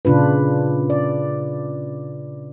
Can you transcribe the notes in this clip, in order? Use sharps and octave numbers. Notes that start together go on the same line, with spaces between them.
A#2 C#3 D4 F4 B4
D5